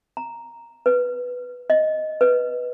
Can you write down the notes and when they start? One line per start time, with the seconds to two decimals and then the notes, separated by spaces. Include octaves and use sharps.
0.17 A#5
0.86 B4
1.70 D#5
2.21 B4